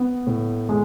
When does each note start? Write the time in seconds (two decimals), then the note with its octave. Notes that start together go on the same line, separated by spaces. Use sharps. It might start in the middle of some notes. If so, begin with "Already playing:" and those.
Already playing: B3
0.27 A2
0.69 G#3